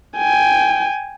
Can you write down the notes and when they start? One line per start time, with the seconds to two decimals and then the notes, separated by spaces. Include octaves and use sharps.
0.17 G5 G#5